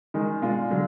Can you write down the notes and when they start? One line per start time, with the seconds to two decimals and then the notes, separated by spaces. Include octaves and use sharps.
0.14 D#3 G#3 D#4
0.42 B2 G#3 D4 F4
0.71 D3 F#3